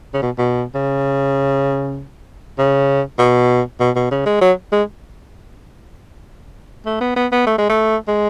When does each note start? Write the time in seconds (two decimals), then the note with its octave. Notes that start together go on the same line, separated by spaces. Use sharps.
0.14 C#3
0.22 B2
0.38 B2
0.75 C#3
2.58 C#3
3.19 B2
3.80 B2
3.96 B2
4.11 C#3
4.26 G#3
4.41 F#3
4.72 G#3
6.86 A3
7.01 B3
7.16 B3
7.32 B3
7.47 A3
7.58 G#3
7.70 A3
8.08 G#3